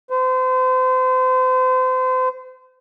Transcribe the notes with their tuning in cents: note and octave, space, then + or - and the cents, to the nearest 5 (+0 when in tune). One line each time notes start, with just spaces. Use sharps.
C5 -35